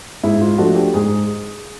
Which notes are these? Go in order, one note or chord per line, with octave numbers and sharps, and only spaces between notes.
G#2 E4
F4
F3 A3 D4 F#4
G4
G#2 G#4